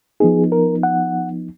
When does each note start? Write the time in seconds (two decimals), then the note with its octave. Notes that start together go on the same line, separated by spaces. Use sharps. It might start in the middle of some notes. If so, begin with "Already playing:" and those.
0.20 F3 B3 D#4 G#4
0.52 A#4
0.83 F#5